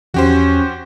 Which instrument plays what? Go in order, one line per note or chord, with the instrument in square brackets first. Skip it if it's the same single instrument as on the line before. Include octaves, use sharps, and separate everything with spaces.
[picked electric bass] E2 E3 F3 [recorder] C#4 [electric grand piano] F#4 G4 C5